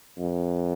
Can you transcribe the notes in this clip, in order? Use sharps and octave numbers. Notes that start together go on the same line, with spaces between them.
F2